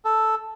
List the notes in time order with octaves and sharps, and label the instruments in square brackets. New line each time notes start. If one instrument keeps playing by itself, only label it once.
[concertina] A4